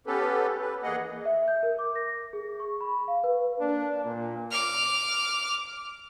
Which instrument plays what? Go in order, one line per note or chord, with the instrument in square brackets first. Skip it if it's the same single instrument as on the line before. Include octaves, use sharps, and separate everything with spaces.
[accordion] B3 C#4 G4 A4 B4
B4
E2 A#3 G#4 D#5 F#5
[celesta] E5
G6
A#4
D6
A#6
G#4
C#6
B5
F5
B4
[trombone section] A#3 D4
A#2
[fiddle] D6 F6